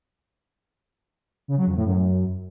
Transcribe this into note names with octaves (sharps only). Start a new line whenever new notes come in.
C#3
F#3
F2
A2
F#2